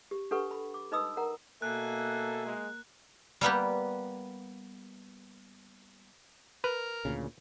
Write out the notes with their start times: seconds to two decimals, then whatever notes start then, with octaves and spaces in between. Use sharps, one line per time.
0.11 G4
0.31 D4 G4 A4 B4 F#5 C#6
0.51 B5
0.74 D6
0.92 D#4 B4 D#5 B5 D#6 E6
1.17 A#4 F#5 A#5
1.62 B2 A#3 A4 E5 G#5 F#6
2.46 G#3
3.41 G3 A#3 B3 G4
6.64 A#4 B4
7.05 D2 A#2 C#3